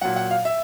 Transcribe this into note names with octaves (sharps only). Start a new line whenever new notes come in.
A#2 F#3 F#5
F#5
F5
E5